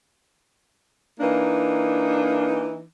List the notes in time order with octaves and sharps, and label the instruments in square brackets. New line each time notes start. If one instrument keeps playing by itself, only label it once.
[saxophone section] E3 A#3 D4 D#4